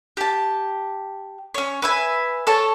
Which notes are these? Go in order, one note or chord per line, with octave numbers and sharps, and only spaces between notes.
G4 A5
C#4 C#5
B4 E5 G#5
A4 C#5 A5